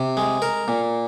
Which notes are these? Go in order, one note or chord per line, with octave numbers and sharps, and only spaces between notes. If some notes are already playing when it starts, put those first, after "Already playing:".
Already playing: C3
G#3
A#4
A#2